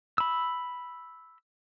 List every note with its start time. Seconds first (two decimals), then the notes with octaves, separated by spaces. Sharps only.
0.18 B5 E6